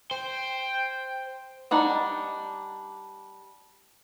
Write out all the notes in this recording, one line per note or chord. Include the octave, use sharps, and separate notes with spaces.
C5 G5
G3 D4 D#4 F#5